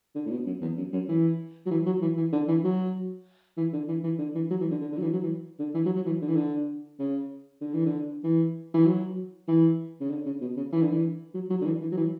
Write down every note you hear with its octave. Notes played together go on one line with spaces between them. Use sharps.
D3
A2
B2
F#2
E2
F#2
F#2
E3
F#3
E3
F#3
E3
E3
D3
E3
F#3
E3
D3
E3
E3
D3
E3
F#3
E3
D3
D3
D3
F#3
E3
F#3
E3
D3
E3
F#3
F#3
E3
D3
E3
D3
C#3
D3
E3
D3
E3
E3
F#3
E3
C#3
D3
C#3
B2
C#3
E3
D3
E3
F#3
F#3
D3
E3
E3
F#3
E3